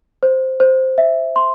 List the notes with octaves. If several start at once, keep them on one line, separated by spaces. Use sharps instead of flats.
C5
C5
E5
C6